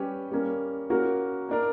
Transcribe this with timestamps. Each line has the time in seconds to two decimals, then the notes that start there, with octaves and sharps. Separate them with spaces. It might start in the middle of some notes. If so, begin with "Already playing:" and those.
Already playing: G3 C#4 G4 B4
0.31 G3 A#3 C#4
0.90 A#3 C#4 F#4 A#4
1.49 A#3 D4 A#4